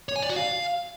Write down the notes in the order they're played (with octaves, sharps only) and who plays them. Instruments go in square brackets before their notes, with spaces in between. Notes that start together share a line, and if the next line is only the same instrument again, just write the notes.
[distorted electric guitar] C#5
G#5
D5
F#4
F5